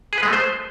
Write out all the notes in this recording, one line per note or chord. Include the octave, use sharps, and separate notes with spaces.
G#4
B4
G#3
A3
C5